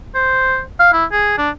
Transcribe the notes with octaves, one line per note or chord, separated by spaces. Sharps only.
C5
F5
E4
G#4
D4